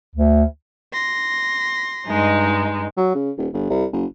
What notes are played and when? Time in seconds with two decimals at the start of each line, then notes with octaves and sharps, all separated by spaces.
0.16 D2
0.93 C6 A#6
2.08 G2 G#3 D#4
2.97 F#3
3.15 C#3
3.38 D#1
3.53 G1
3.70 C2
3.92 F#1